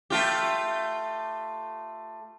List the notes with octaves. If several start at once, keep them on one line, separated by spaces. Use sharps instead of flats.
A3 F4 G4